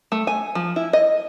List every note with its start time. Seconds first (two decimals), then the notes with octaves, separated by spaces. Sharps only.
0.12 A3
0.27 G#5
0.55 F3
0.76 E4
0.93 D#5